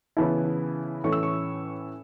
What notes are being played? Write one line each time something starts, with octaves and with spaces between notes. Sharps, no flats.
C#3 E3 B3 E4 A5
A2 E3 A3 C#4 C#6
E6
C#6